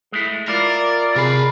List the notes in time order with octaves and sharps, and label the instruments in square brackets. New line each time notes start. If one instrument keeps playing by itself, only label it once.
[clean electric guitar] G#3 A3 E4
[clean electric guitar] E4 F4 [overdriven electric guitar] A#4 [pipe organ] D5
[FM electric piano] C3 G#4 C7 [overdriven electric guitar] A#4 B5